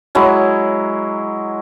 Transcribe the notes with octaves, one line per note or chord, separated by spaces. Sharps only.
F#3 G#3 E4